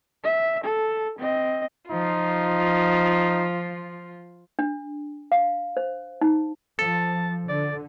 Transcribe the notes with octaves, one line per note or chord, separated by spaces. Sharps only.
E5
A4
C4 D#5
F3 D#4 F4
D4
F5
C5
D#4
F3 A4 A5
D3 D5